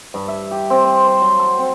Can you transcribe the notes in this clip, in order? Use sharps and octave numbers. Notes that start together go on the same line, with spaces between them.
G2
E5
G4
C4
C5
C5
F#3
A4
C4